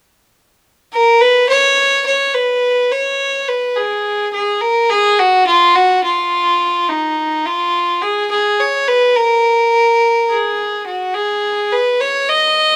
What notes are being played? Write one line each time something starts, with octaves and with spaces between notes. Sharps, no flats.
A#4
B4
C#5
C#5
B4
C#5
B4
G#4
G#4
A#4
G#4
F#4
F4
F#4
F4
D#4
F4
G#4
G#4
C#5
B4
A#4
G#4
F#4
G#4
B4
C#5
D#5